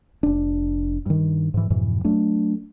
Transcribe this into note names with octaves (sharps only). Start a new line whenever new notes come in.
F1 D4
G2 D#3
G#2 E3
F2 G#2 B2 E3
F#3 A3 D4